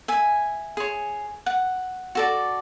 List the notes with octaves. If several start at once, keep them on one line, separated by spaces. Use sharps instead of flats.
E5 G#5
G#4 C#5
F#5
F#4 A4 D5